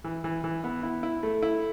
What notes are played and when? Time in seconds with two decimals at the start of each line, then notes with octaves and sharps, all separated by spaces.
0.04 E3
0.24 E3
0.44 E3
0.64 B3
0.83 E4
1.03 E4
1.23 A3
1.42 E4